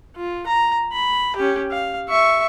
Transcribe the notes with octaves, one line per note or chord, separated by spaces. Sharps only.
F4
A#5
B5
C#4 G4
F5
E5 C#6